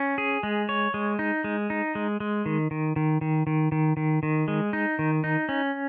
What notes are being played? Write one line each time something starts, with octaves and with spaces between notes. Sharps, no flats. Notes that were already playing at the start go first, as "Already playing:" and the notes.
Already playing: C#4
G#4
G#3
C#5
G#3
D#4
G#3
D#4
G#3
G#3
D#3
D#3
D#3
D#3
D#3
D#3
D#3
D#3
G#3
D#4
D#3
D#4
C#4